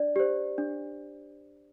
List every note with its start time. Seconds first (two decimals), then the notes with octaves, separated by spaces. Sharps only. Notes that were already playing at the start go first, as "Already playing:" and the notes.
Already playing: D4 D5
0.16 G4 C5
0.58 D4